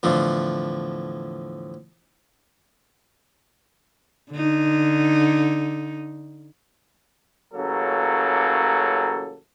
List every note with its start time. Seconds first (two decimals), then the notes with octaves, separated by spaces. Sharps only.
0.03 E2 A2 D3 F3
4.32 D3 D#4
7.53 A1 C#3 F#3 A#3 A4